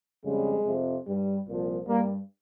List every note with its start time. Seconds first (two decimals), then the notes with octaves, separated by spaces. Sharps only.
0.25 F2 C#3 G3 G#3
0.65 F2 C3 F3
1.06 G2 G3
1.47 C2 A#2 F3
1.86 G2 G3 A#3